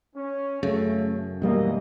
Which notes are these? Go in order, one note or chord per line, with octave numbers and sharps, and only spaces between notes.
C#4
F#2 C#3 A3
E1 D#2 E3 G3 A#3 D#5